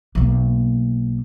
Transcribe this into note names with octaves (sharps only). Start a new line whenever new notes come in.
B1 A#3